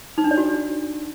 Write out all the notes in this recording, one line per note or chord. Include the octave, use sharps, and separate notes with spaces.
D#4
D4
D5
F#4